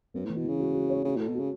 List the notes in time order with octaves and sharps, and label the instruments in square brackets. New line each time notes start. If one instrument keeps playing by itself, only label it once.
[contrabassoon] F#2 [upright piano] B3
[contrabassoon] A2 [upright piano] E3
[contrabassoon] B2
[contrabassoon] C#3 [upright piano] E3
[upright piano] F#4
F#4
C#5
[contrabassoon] C#3 [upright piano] F#4
[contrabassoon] A2 [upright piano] A4
[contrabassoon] B2
[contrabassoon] C#3 [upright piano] F#4